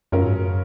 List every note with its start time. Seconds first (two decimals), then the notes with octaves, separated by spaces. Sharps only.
0.12 F#2 C#3 F#3 C#4 F4 A#4
0.24 G#2
0.35 F#2